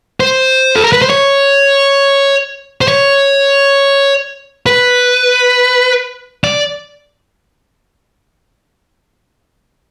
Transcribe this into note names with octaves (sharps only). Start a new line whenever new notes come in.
C5
A4
A#4
B4
C5
C#5
C5
C#5
B4
D5